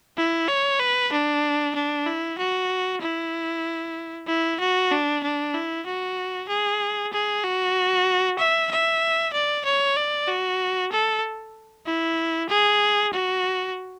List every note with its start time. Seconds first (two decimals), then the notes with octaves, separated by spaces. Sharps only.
0.18 E4
0.48 C#5
0.80 B4
1.13 D4
1.76 D4
2.06 E4
2.38 F#4
3.01 E4
4.27 E4
4.60 F#4
4.92 D4
5.24 D4
5.54 E4
5.86 F#4
6.49 G#4
7.13 G#4
7.44 F#4
8.39 E5
8.71 E5
9.33 D5
9.65 C#5
9.96 D5
10.28 F#4
10.92 A4
11.86 E4
12.49 G#4
13.13 F#4